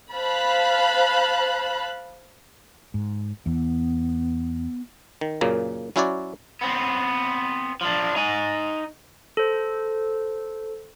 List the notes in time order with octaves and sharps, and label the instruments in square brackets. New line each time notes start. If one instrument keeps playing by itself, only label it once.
[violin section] C5 F5 A5 B5 F#6
[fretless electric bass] G#2
[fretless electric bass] E2 E3 [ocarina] B3
[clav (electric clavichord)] D#3
F#2 A#2 C#3 A#3
F#3 C#4 E4 F#4 C#5 D5
[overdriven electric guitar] B3 C4
F3 D4
D#4 G#5
[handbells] A4 C5